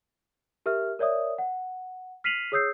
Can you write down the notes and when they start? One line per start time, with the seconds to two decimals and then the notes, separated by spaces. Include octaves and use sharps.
0.66 G4 A#4 E5 F6
0.99 A#4 C#5 D5 E5 D#6
1.38 F#5
2.24 F6 B6 C7 D#7 F7 F#7
2.52 G#4 C#5 D#6 E6 G6 C7